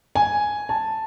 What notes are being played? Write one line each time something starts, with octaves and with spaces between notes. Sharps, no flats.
G#5
A5